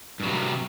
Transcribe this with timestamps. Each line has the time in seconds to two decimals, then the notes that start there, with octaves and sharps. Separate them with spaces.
0.20 G2
0.23 F#3
0.26 C3